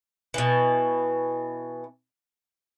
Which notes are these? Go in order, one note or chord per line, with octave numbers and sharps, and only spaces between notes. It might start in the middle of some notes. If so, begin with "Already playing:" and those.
B2 E3